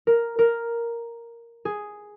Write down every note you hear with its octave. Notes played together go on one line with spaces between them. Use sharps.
A#4
A#4
G#4